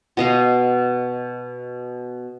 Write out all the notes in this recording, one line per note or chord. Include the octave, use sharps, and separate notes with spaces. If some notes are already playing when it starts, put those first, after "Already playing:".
B2 D#5 F5